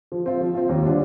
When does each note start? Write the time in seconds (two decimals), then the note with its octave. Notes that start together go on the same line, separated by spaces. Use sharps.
0.12 F3
0.26 C4 F4
0.41 F3
0.55 C4 F4
0.69 D#2
0.84 D3 G3 D4 F4